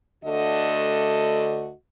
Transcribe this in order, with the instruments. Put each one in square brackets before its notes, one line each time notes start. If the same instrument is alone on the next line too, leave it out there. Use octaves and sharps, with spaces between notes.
[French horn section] D2 D3 A3 F#4 A4 D#5